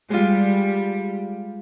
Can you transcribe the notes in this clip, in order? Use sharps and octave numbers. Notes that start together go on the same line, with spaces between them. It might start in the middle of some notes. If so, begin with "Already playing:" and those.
G3 G#3 F4